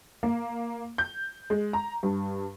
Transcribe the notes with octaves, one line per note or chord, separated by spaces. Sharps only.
A#3
G6
G#3
A#5
G2